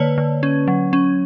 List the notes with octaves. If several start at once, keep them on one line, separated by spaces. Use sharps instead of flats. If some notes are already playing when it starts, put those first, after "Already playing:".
Already playing: D3 A#3 B4 C#5
D3
C#4
F#3
C#4